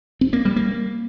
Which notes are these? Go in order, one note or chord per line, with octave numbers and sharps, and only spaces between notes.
C4
A#3
G3
A#3